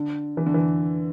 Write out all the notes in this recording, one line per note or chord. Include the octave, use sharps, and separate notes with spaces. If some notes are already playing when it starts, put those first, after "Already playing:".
Already playing: D3
E3
D3
E3